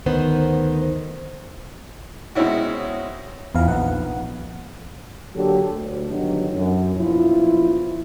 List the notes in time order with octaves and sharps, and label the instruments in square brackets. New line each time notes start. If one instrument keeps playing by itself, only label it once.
[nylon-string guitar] D2 D#3 B3 [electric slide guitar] C5
[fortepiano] B2 G#3 C4 C#4 E4 F#4
[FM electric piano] E2 F5 [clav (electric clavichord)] E3 F3 B3
[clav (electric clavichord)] A#1 B3 D#4 [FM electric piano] F#5
[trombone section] D3 F#3 A#3 F#4 G4 A4
D2
G2 B2 D3 D#3 F#3
F#2
A#1 B2 F3 E4